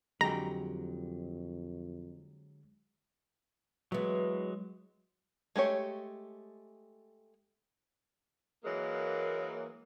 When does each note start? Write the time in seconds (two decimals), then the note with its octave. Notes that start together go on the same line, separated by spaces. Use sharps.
0.21 F2 D3 F#3 G#3 G4 A#5
3.92 E3 F#3 G#3 B3
5.56 G#3 A3 G4 C#5
8.64 E3 F#3 G#3 A#3